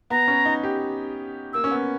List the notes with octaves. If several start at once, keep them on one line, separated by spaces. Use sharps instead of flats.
B3 A#5
C#4
D#4
G4
A#3 E6
C#4
B3